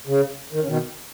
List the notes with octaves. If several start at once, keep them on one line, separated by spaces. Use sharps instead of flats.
C#3
D#3
C#3
B2 D#3